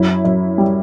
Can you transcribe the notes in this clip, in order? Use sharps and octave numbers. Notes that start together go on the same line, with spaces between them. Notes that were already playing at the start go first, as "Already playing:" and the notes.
Already playing: F#2 E4
F#2
G3